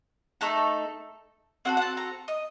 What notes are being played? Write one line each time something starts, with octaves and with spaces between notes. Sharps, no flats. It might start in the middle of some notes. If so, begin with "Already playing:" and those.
A3 D#4 A4
C4 F#4 A4 F#5
F#5
A5
A#5
D#5